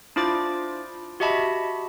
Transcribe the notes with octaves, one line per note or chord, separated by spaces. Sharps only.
D4 E4 F4 C5 D6 A6
F#4 G4 D#5 E5 A5 B5